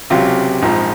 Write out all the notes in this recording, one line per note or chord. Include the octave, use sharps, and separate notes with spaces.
C#2 C3 F#3 F4
A#1 G#2 F3